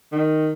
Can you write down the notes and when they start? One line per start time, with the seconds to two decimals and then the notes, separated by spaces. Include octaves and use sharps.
0.12 D#3